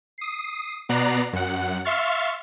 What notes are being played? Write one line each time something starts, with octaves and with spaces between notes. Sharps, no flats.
D#6 C7
B2 B3 D5 A#5 F#6 C7
F#2 F#5
E5 F5 C6 C#6 F6 A6